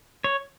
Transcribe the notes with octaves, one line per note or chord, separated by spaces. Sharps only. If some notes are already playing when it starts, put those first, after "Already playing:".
C#5